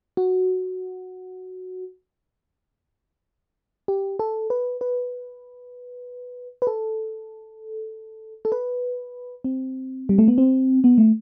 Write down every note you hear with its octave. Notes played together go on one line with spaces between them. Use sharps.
F#4
G4
A4
B4
B4
B4
A4
A4
B4
C4
G3
A3
B3
C4
B3
A3